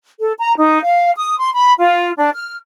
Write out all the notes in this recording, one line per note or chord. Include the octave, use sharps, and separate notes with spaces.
A4
A#5
D#4
F5
D#6
C6
B5
F4
D4
F6